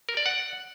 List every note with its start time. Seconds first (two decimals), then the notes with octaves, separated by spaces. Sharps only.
0.09 A#4
0.17 D5
0.26 F#5